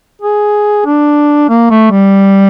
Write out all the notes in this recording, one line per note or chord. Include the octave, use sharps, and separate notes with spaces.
G#4
D4
A#3
A3
G3